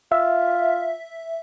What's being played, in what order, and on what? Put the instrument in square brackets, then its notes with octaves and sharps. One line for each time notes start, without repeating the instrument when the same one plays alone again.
[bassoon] F4 [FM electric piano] E5